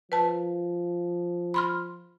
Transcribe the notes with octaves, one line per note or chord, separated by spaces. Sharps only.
F3 B4 A5
B5 C6 F6